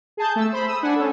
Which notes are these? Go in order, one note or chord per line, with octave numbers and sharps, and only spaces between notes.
G#4 A5 G6
A3 E6
C5 B5
D#6 E6
D4 F#5 G#5
C#4 A4